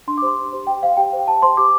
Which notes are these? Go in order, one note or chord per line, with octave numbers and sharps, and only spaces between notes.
D4 C6
D6
G4 C5 C6
D4
G4 C5
G4 G5
C5 F5
G4 G5
C5
G4 A5
C5 C6
G4 D6